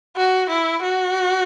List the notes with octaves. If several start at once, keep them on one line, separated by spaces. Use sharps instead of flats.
F#4
E4
F#4